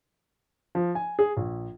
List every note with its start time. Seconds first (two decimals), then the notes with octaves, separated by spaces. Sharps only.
0.75 F3
0.95 G#5
1.19 G#4
1.37 A#1